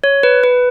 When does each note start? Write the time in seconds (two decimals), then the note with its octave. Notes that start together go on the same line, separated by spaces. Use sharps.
0.04 C#5
0.23 B4
0.44 B4